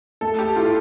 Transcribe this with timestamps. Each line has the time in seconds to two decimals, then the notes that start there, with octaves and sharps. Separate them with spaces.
0.21 A3 A4
0.39 G4
0.56 E4 F4 A4